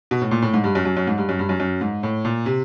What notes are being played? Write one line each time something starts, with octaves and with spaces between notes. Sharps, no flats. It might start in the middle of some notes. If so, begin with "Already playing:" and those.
B2
A2
A#2
A2
G#2
G2
F#2
F#2
F#2
G#2
G2
F#2
G2
F#2
F#2
G#2
A2
A#2
C3